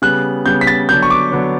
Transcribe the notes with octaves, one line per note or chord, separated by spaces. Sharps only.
C#3 G3 B3 F#6
C#3 G3 B3 G6
B6
A6
D3 F#3 B3 D4 G6
C#6
D6
D3 F#3 B3 D4